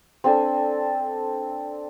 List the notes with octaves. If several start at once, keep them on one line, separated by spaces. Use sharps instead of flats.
C4 D4 A4 G#5